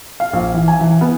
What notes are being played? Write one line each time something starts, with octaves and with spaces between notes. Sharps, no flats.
F5
A#1
E3
G#5
E3
B3